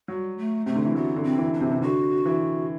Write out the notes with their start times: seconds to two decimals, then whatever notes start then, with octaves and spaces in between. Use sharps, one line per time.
0.08 F#3 G3
0.38 A3
0.66 C3 A3
0.75 D3
0.85 E3
0.95 F#3 B3
1.16 D3
1.24 C4
1.38 E3
1.53 D4
1.61 C3
1.71 C3
1.82 D3 F#4
2.26 E3